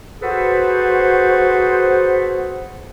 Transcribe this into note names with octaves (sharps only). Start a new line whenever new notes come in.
F#4 G#4 A4 B4 C5